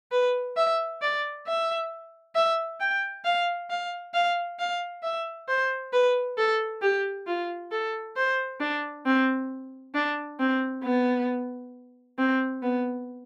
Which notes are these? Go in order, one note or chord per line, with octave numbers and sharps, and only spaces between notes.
B4
E5
D5
E5
E5
G5
F5
F5
F5
F5
E5
C5
B4
A4
G4
F4
A4
C5
D4
C4
D4
C4
B3
C4
B3